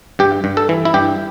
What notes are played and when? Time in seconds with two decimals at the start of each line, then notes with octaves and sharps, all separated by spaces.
0.19 G2 G4
0.44 G2
0.57 A4
0.69 E3
0.85 E4
0.94 G2 G4